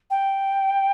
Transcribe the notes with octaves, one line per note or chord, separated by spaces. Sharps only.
G5